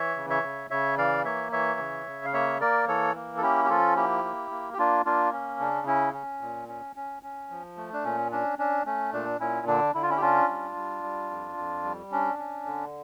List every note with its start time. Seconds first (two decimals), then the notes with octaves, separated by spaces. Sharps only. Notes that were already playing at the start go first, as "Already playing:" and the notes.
Already playing: E3 C#5 E5
0.17 C#3
0.30 C#5 E5
0.43 C#3
0.71 C#3 C#5 E5
0.98 E3 D5 F5
1.25 A#3 C#5 E5
1.52 E3 C#5 E5
1.79 C#3
2.07 C#3
2.25 F5
2.34 A#3 C#5 E5
2.61 A#3 A#4 D5
2.88 E3 A4 C#5
3.15 A#3
3.37 A4
3.42 C#4 E4 G4
3.65 G4
3.69 F3 F4 A4
3.97 A#3 E4 G4
4.24 A#3
4.51 A#3
4.73 G4
4.78 A#3 D4 F4
5.06 A#3 D4 F4
5.33 C#4
5.60 C#3 D4
5.87 C#4 E4
6.14 C#4
6.41 A#2
6.68 C#4
6.96 C#4
7.23 C#4
7.50 F3
7.77 A3
7.93 D4
8.04 A#2 C#4
8.32 C#4 D4
8.58 C#4 D4
8.86 A3 C#4
9.13 A#2 D4
9.40 A#2 C#4 E4
9.67 D3 D4
9.95 D3 E4
10.02 F4
10.10 C#4 E4
10.17 G4
10.22 C#4 D4 F4
10.49 G3
10.76 G3
11.03 G3
11.30 F2
11.57 F2
11.85 G3
12.12 C#4 D4
12.39 C#4
12.66 D3